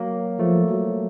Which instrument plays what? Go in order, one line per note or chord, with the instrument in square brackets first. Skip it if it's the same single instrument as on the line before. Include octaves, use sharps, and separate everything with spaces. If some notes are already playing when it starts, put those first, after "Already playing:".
Already playing: [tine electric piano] F#3 A#3
[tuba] F3 [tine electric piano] A3
[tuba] F#3